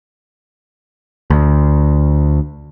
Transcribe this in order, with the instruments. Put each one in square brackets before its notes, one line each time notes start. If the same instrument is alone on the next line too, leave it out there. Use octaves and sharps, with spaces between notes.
[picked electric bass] D2